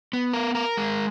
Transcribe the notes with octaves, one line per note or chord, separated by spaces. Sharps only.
B3
A#4
A#4
G#3